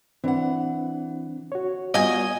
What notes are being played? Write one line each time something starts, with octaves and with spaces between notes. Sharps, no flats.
E3 C4 D4 F#5
F#4 C#5
G3 B3 F4 F#4 D#5 G#5